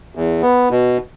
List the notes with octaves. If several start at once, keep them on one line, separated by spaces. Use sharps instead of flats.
E2
B3
B2